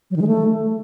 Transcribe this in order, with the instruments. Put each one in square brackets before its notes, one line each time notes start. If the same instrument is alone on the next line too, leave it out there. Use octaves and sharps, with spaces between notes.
[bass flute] F#3
D#3
G#3
A3